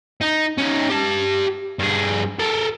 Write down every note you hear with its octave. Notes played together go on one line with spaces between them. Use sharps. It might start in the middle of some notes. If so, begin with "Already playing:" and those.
D#4
C#4 D#4
G4 A5
G2 G#4
A4 A#4